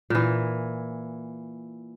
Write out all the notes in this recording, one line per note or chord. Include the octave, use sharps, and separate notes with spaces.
A#2 E3